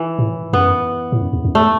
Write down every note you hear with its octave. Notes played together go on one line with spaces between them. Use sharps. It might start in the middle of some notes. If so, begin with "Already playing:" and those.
Already playing: E3
A2
F#2 B3
A2
F#2
E2
F#2
A3